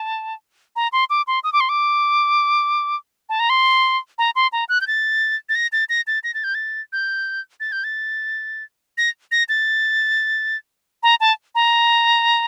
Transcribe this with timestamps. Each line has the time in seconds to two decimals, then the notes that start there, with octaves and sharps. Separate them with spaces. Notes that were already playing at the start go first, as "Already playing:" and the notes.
Already playing: A5
0.76 A#5
0.92 C6
1.10 D6
1.27 C6
1.44 D#6
1.53 D6
1.60 C6
1.69 D6
3.29 A5
3.40 A#5
3.49 C6
4.18 A#5
4.35 C6
4.52 A#5
4.69 F#6
4.81 G6
4.87 A6
5.49 A6
5.55 A#6
5.72 A6
5.89 A#6
6.07 A6
6.24 A#6
6.34 A6
6.44 G6
6.55 A6
6.93 G6
7.60 A6
7.72 G6
7.84 A6
8.98 A#6
9.31 A#6
9.49 A6
11.03 A#5
11.20 A5
11.55 A#5